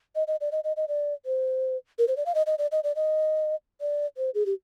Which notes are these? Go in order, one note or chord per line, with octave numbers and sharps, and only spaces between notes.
D#5
D#5
D5
D#5
D#5
D#5
D5
C5
A#4
C5
D5
F5
D#5
D#5
D5
D#5
D5
D#5
D5
C5
G#4
G4